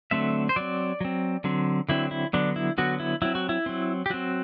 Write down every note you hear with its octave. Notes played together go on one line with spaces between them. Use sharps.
D3 F#3 A3 C4 E5
C5
F#3 C4 D5
F#3 C4
D3 F#3 C4
D3 F#3 C4 E4
E4
D3 F#3 B3 D4
E4
D3 F#3 B3 F#4
E4
F#3 C4 E4
F#4
E4
F#3 C4
G4
F#3 C4 F#4